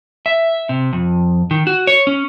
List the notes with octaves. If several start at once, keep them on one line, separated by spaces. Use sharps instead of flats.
E5
C3
F2
D#3
F#4
C#5
C#4